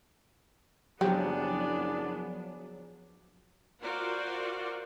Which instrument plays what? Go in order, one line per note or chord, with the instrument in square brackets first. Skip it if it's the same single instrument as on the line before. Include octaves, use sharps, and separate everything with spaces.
[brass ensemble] F#1 G#4 D5 [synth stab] F3 F#3 [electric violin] B3 D4 [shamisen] G4
[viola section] F4 F#4 A#4 C5 D5